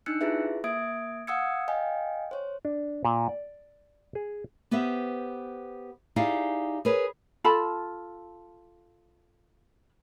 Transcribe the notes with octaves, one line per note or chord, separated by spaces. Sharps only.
D4 D#4 E6 F#6 C#7
E4 F4 G4 G#4 B4 E5
A#3 E5 D#6 G#6 D7
F5 F#5 D#6 E6 G#6 C#7
D#5 F5 G5 G#5
C5 C#5
D4
A#2
D5
G#4
B3 G4 B4 C5 E5
D#4 E4 G4 G#4 D5 F5
G#4 A#4 B4 C#5
F4 A4 A5 B5